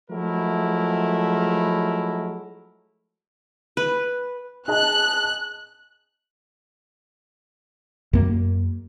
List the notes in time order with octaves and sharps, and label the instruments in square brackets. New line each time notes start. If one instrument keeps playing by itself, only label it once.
[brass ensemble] F3 F#3 G#3 A3 E4 A#4
[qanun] B4
[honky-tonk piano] G#4 D#5 A5 [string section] F#6
[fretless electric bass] F#2 A#3